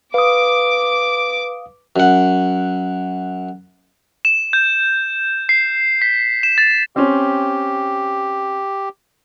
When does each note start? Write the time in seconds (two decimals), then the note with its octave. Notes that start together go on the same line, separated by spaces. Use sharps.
0.14 B4 F5 D6 D#6
1.96 F#2 F#5
4.25 E7
4.53 G6
5.49 C7
6.02 B6
6.43 E7
6.58 A6
6.96 C4 C#4 G4